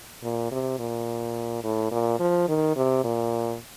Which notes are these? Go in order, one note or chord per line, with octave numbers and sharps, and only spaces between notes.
A#2
C3
A#2
A2
A#2
F3
D#3
C3
A#2